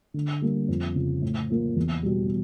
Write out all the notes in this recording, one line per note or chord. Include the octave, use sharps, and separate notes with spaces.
D3
G3 A#3
F2
C#3 F3
A2
F3 A#3
E2
B2 G3